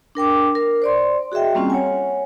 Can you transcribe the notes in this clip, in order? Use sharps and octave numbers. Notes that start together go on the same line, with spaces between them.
D4 A#4 G5 D6
A#4
C5 D5 C6
F#4 G#4 D#5 E5 G5
G3 A#3 C4 C#4 F4 G5
C#5 F#5 G#5